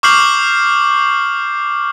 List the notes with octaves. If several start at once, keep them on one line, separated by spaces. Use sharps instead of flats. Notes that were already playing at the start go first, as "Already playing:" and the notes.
C#6 D6 F6 G6 C7 F#7